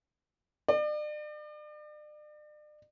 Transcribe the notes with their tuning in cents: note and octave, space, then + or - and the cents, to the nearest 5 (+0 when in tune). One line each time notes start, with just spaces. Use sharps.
D5 +40